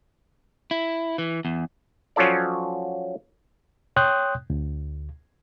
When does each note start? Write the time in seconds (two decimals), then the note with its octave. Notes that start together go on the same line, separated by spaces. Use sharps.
0.71 E4
1.18 E3
1.45 E2
2.16 F3 F#3 C#4 F4 A4 D5
3.96 C#5 G5 C6 D#6 F#6 G6
4.50 D2